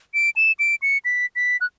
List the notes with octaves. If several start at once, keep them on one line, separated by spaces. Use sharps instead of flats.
D7
E7
D7
C#7
B6
B6
F#6